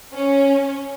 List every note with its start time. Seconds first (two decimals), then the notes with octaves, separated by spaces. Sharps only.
0.14 C#4